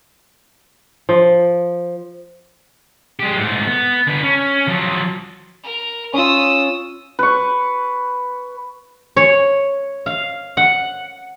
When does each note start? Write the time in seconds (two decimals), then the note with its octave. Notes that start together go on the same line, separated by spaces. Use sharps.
1.09 F3
3.19 G#3 G4
3.36 G#2 A3
3.67 B3
4.07 D3 B4
4.23 C#4
4.68 F3 F#3
5.63 A#4
6.14 C#4 F4 D#6 E6
7.19 B4 C#6
9.16 C#5
10.06 F5
10.57 F#5